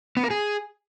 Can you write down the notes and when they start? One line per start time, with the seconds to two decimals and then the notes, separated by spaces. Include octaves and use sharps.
0.17 B3
0.24 A#4
0.30 G#4